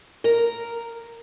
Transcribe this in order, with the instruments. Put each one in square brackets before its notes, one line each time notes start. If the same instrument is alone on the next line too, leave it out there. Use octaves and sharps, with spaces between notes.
[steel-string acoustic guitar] A#4